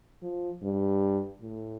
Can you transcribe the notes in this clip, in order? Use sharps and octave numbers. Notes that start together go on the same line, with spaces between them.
F3
G2
A2